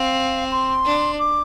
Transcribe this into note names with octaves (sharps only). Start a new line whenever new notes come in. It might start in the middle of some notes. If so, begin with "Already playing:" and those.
Already playing: C4 F5
C6
D4
D6